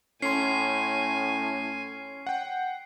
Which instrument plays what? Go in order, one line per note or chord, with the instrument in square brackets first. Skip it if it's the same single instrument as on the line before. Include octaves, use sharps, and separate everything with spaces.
[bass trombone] A2 [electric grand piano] C#4 C6 [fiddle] G#5 [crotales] C7
[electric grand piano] F#5 G5